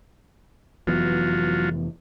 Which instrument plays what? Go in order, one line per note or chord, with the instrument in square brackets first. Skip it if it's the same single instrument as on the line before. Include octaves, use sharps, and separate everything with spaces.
[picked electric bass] F1 E3 B3 [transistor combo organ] F#3 F4